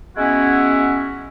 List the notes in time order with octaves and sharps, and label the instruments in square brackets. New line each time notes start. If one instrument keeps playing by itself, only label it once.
[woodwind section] G#3 B3 C#4 E4 F#4